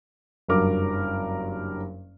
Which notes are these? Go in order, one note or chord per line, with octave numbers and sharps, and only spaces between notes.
F#1 G2 F#3 A#4 D6